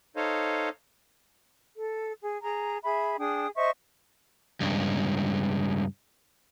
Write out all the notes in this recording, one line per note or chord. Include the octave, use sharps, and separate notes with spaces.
D#4 A4 C5 C#5 D#5 F5
A4
G#4
G#4 A#5
G#4 E5 B5
D4 G#4 G5 D#6
C5 D#5 E5 C#6
C#2 G2